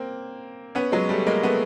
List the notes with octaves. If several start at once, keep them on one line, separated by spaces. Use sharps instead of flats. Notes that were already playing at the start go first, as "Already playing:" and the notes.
Already playing: A#3 C4
B3 C#4
F#3 G#3
G3 A3
G#3 A#3
A3 B3